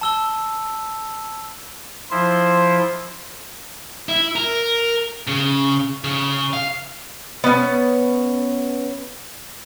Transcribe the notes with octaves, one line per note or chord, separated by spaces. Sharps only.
A5 E6 G7
F3 E4 C5
E4
A#4
C#3
C#3
F5
B3 C#4